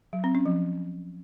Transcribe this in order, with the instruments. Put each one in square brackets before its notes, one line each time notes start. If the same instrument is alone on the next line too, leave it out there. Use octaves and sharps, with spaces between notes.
[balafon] F#3
C4
C#4
F3